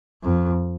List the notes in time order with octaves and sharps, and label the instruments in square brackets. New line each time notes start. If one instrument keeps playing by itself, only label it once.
[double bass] F2